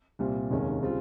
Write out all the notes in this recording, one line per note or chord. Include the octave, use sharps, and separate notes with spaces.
C2 A#2 G3 C4
F1 D#2 D#3 G#3 C#4
C#3 G3 C4 F4